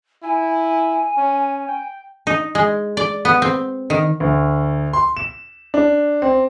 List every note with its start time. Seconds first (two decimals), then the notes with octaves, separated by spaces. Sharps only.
0.23 E4 G#5
1.18 C#4
1.68 G5
2.27 D#4
2.55 G#3
2.97 D5
3.25 B3
3.42 C4
3.90 D#3
4.20 D2
4.93 C6
5.17 E7
5.74 D4
6.22 C4